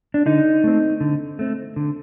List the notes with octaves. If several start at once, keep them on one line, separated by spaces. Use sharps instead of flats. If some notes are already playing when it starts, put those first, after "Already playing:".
D4
D3 D#4
A3 C4
D3
A3 C4
D3